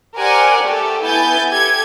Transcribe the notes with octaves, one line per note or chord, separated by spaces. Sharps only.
G4 A#4 C5 D5 F#5 G#5
A3 G4 A4
B3 E4 G#5 G6 A6
G4 A4 G#6